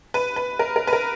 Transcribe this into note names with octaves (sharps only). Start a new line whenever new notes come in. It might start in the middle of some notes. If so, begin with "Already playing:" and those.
B4
B4
A#4
A#4
B4
A#4